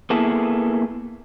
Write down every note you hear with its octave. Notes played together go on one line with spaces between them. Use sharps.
A#3 B3 E4 G#4 A4